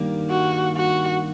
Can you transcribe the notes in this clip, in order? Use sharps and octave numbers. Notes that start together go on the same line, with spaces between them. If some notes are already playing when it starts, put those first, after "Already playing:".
Already playing: G2 D#3 G3 A#3
F#4
F#4